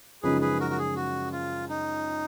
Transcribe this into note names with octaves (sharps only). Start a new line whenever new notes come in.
F#2 C#3 F3 G#3 D#4 G#4 B4
G#4 B4
F#4 A#4
F#4
G#4
F#4
F4
D#4